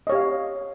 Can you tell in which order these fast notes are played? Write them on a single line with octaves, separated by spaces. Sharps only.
D#5 C#5 G4 F5